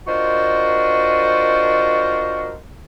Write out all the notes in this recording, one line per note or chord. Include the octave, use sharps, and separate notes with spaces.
D4 F4 F#4 A#4 C5 D#5